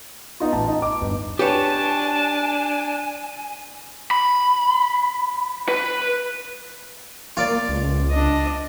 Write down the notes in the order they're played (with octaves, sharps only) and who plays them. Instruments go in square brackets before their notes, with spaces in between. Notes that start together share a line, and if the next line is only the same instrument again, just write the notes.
[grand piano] B3 D#4 F4
A1 A5
D#4
D6
G1
[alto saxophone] D4 [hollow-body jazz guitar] G4 B4 C#5 [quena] G#5 [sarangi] A5
[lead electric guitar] B5
B4
[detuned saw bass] A#3 [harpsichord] F4 D5
[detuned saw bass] C#2
[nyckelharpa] D4 D#5